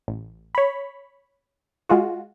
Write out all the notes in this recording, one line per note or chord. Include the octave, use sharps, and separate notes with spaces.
A1
C#5 B5
G#3 F4 F#4